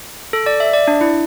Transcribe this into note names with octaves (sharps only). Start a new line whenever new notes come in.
A4
D5
E5
D5
D4
E4